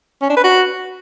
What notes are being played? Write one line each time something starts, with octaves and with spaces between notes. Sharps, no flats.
C#4
D4
B4
F#4